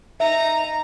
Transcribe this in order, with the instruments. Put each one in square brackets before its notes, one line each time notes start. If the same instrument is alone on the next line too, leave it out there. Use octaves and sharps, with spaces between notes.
[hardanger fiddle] D#4 A#5 [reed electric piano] E5